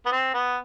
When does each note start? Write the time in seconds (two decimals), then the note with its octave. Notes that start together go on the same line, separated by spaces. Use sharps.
0.06 B3
0.12 C4
0.34 B3